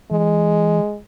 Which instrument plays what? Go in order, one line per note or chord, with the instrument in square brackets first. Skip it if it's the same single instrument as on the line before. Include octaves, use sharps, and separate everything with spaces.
[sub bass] E3 [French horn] G#3